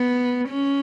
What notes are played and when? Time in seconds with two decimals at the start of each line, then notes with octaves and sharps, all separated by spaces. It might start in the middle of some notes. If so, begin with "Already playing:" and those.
Already playing: B3
0.48 C#4